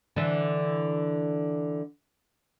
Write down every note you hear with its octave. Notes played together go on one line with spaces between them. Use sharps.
D3 E3